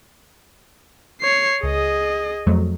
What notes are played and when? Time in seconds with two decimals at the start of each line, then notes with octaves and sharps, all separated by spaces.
1.21 C#5 C7
1.63 C#2 G#4 D#5
2.46 F2 F#3 A3